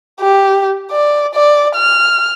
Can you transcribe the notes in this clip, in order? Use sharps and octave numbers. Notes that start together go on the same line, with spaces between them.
G4
D5
D5
F6